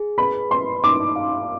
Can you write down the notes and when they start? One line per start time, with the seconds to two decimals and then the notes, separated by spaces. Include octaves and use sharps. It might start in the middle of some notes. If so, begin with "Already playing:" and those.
Already playing: G#4
0.18 B4 B5
0.51 B4 C6
0.84 D#4 D6
1.16 F5